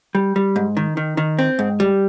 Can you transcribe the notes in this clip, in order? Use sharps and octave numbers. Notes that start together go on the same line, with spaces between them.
G3
G3
G#2
D#3
D#3
D#3
C4
G#2
G3